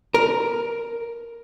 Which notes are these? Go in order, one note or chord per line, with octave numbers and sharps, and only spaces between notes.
A#4